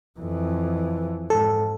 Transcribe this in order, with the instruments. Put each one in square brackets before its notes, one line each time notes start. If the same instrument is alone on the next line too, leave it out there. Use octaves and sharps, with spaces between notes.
[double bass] F2 E3
[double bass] G#2 [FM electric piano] A4